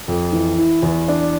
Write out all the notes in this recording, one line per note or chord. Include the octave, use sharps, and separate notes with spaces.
F2
E3
E4
E2
D4